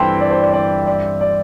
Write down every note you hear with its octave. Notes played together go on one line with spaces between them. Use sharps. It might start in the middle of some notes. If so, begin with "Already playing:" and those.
Already playing: G2 E3 C4 E4 A4 G5 C6
D5
C5
D5
D5
D5
D5